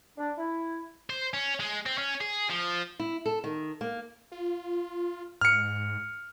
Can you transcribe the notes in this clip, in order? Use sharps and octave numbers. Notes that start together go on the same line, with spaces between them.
D4
E4
C5
C#4
G#3
C4
C#4
G#4
F3
E4
A4
D#3
A#3
F4
G#2 F6 C#7